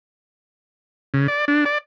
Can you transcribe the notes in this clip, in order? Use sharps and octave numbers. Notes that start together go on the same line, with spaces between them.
C#3
D5
D4
D5